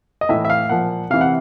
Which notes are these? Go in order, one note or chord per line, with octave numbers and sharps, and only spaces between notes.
D#5
A2 E3 E5
E5
F5
A#2 F3 F#5
C3 E3 F5
F#5